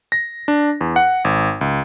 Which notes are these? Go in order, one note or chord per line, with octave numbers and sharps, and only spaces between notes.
A#6
D4
E2
F#5
G#1
C#2